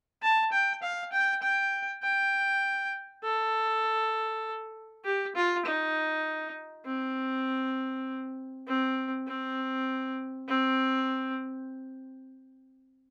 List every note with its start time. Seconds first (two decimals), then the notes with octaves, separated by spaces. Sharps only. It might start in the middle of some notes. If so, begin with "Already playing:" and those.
0.22 A5
0.52 G5
0.82 F5
1.13 G5
1.43 G5
2.03 G5
3.24 A4
5.05 G4
5.35 F4
5.66 D#4
6.86 C4
8.67 C4
9.28 C4
10.48 C4